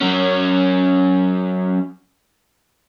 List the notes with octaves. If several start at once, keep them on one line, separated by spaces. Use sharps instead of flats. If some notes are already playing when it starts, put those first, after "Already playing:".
F#3 C#4